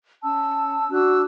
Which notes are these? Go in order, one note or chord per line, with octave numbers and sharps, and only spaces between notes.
C#4 A5 E6
D4 F#4 E6 F#6